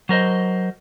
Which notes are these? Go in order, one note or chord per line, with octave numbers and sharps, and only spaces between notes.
F#3 A#4 C5 D#5